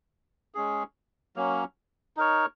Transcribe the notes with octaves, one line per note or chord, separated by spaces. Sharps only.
G#3 C#4 G#4
F#3 A#3 C#4
D#4 A#4 C#5